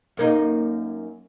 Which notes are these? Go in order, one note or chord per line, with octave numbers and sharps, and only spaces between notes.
F#2 A#3 D#4